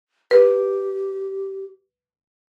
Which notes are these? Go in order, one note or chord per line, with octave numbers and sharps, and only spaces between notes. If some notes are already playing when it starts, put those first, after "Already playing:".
G4 B4